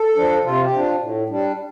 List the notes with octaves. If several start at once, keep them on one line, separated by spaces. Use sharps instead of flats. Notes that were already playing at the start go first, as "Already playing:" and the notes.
Already playing: A4
F3 D4
C3 F4
G4
F3 D4
A2
G3 D4